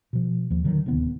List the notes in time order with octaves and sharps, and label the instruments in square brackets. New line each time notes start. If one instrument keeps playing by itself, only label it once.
[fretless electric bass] B2 F3
D#2 F3
D3 D#3 F#3
D1 D#2 C3 B3